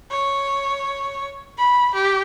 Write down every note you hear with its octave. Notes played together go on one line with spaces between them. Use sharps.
C#5
B5
G4